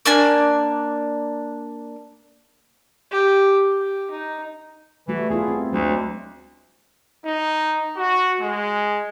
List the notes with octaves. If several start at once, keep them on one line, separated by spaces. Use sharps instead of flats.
A#3 D4 G#5
G4
G4
D#4
E3 G3 A3 F#4
B3 E4 F4 G#4
C4
D2 F#3 G#3 D4
D#4
F#4
G#3